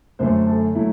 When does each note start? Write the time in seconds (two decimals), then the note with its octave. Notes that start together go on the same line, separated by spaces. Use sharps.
0.19 F#2 D3 F#3 A3 C5
0.47 A4
0.75 D3 F#3 A3 E4